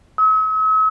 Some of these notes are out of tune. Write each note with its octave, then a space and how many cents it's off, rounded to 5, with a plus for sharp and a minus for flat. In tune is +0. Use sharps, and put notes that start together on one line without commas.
E6 -45